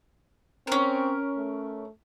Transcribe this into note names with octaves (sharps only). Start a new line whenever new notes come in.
C4 C#4 A#4
A3